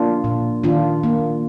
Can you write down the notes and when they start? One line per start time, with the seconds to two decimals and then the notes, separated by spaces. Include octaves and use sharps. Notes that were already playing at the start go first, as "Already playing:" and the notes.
Already playing: A#3 D4 F4
0.24 A#2
0.64 D#3 D4 F4
1.04 A#3